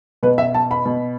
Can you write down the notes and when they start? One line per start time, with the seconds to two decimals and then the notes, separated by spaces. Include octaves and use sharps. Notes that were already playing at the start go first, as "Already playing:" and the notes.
0.23 B2 B4
0.38 E5
0.54 A5
0.71 B5
0.85 B2